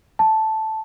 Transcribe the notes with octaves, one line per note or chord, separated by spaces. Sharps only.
A5